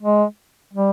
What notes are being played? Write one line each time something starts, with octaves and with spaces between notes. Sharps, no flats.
G#3
G3